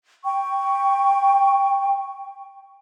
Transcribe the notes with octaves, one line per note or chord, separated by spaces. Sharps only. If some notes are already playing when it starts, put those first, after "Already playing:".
G5 C#6